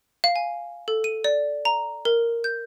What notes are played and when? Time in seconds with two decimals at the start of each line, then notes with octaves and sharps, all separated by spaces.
0.24 F5
0.36 G#5
0.88 A4
1.04 D#7
1.24 D5
1.65 A#5
2.05 A#4
2.44 G6